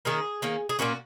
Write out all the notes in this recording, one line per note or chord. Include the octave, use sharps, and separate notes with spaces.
D#3 A#3 C#4 G#4
D#3 A#3 C#4
G#4
A#2 A#3 C#4 F#4